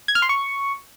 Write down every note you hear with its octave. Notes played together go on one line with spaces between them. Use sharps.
G#6
F6
C6
C#6